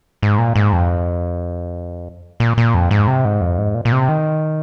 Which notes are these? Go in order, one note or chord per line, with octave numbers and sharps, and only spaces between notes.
G#2
A#2
G#2
F2
A#2
A#2
F2
G#2
C3
G#2
F2
G#2
A#2
A#2
C3
D#3